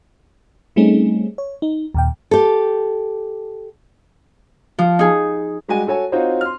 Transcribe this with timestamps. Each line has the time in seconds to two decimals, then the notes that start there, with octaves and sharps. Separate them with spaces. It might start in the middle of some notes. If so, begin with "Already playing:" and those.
0.76 G3 A3 C4 C#4 D#4 G#4
1.38 C#5
1.62 D#4
1.94 D#2 A#2 G5
2.31 G4 A4
4.79 F3
4.99 D#4 G#4
5.68 G3 G#3 F#4 G4 G#5 D#7
5.87 F#4 A4 C#5 G#5
6.12 C4 D#4 F4 F#4 C5 C#5
6.41 C6 F6